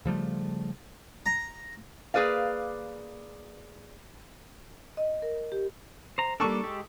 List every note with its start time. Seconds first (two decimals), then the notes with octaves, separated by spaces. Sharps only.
0.05 C#3 F3 G3 A3
1.26 A#5
2.14 A#3 G#4 B4 D5 F5
4.97 D#5
5.22 A#4
5.52 G4
6.18 C5 A#5
6.40 G3 A#3 D4 A4 A5 C#6
6.64 G#3 G4